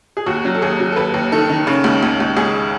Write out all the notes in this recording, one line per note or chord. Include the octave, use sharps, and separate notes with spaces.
G#4
D#2 F#4
F#3
A4
D#2 G#4
F#3
A4
D#2 B4
D#2
D#3 A4
D#3
C#3
C#2
C#2
C#2
C#2 G#4